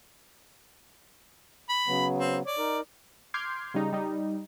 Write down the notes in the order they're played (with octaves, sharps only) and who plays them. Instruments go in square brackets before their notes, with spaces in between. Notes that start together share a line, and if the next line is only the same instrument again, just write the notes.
[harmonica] B5
[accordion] C#3 F#3 B3
[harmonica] C4
[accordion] C#5 [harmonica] D5
[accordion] D#4 A#4
[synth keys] C6 D6 F6 G6 G#6 C7
C#3 G3 D#4
G3 D#4